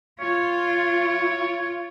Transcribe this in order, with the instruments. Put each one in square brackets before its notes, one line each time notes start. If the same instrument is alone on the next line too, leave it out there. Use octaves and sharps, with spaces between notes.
[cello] F4 [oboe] C#5